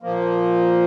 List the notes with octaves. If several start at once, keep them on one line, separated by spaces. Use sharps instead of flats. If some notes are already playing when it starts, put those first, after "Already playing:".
A#2 F3 A#3